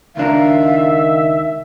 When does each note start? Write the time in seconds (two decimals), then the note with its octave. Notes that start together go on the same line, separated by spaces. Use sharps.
0.17 C#2 D#3 D4 A#4 E5 F5